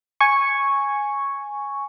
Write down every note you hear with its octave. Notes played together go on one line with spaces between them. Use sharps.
G#5 C#6